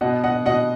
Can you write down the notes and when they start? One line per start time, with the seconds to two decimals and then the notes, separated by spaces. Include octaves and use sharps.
0.01 B2 D#5 F#5
0.24 D#5 F#5
0.46 B2 D#5 F#5